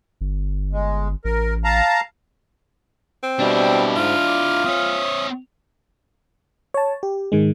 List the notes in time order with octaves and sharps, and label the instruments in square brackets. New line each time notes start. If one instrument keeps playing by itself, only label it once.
[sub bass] G1
[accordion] G#3
[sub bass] A1 [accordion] A#4
[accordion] F5 A5 A#5
[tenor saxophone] C4
[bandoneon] B2 G3 [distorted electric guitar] D4 E4
[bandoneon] G#2 [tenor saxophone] F4
[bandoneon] D6
[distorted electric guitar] C4 C#5 [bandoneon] E5 D#6
[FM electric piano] C#5 A5
G4
G#2 D#3 G#3